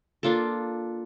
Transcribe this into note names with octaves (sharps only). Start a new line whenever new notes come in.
A#3 D4 F4 A4